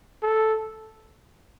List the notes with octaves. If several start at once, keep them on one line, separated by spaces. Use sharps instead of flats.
A4